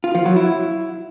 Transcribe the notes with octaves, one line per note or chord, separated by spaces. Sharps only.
F4
F3
F#3
E4